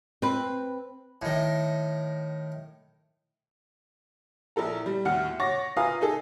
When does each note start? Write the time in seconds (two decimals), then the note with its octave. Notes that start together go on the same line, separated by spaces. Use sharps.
0.22 C4 B4
1.22 A2 D#3
4.56 A#1 E4 A4 A#5
4.86 G3
5.05 D#2 A2 F#4 F#5 F6 C#7
5.40 C#5 F#5 C#6 D6 A6 A#6
5.77 F4 B4 F5 G#5 A#5 D#6
6.01 D#4 G#4 A4